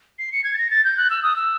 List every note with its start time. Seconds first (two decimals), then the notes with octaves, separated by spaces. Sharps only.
0.19 C7
0.32 C#7
0.44 G#6
0.54 A6
0.58 A#6
0.70 A6
0.84 G6
0.97 F#6
1.10 E6
1.23 D#6
1.36 E6